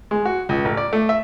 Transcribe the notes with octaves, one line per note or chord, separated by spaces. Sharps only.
G#3
F#4
C#2
A1
D5
A3
E5